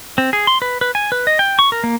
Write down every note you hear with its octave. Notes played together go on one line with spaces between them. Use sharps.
C4
G#4
C6
B4
B4
G#5
B4
D#5
G5
C#6
A#4
A#3